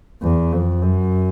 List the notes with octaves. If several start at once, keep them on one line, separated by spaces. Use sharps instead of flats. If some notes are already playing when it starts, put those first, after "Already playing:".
E2
F2
F#2